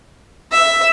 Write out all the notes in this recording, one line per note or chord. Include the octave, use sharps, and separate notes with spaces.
E5